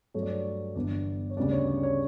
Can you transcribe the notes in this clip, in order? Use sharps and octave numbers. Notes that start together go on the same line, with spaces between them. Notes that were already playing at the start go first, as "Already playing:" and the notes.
G2 F#3 A3 C#5
D5
C#5
G1 G2 E3 B3 D4 D5
C#5
D2 C#3 G3 B3 D4 D5
C#5
D5
C#5